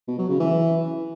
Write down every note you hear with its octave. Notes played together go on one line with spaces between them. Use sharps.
B2
F#3
C#3
E3